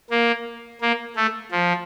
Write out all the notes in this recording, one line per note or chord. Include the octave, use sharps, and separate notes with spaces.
A#3
A#3
A3
F3